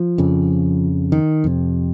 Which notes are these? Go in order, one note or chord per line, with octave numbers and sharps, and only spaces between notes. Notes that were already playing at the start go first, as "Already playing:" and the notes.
Already playing: F3
F2 C#3
D#3
F2 C3